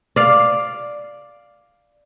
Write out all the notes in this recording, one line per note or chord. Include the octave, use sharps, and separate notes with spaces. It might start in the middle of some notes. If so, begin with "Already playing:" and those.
D5 F5